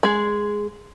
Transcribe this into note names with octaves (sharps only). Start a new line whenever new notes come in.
G#3 G#4